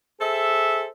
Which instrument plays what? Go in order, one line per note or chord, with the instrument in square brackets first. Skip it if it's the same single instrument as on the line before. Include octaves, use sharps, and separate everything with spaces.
[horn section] G#4 A4 C5 E5